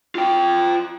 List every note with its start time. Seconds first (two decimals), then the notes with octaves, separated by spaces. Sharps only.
0.15 F4 G5